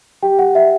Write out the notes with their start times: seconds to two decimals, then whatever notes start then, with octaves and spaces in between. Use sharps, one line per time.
0.23 G4 G5
0.39 F#5
0.55 G4 E5